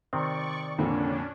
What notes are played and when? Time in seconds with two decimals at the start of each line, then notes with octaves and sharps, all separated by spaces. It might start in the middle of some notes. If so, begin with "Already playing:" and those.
0.13 C3 D#3 C4 D5 C#6
0.78 F2 A#2 D3 C#4 D4